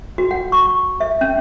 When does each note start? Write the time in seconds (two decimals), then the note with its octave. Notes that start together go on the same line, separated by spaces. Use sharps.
0.18 F#4
0.31 F#5
0.52 C#6
1.00 E5
1.21 C#4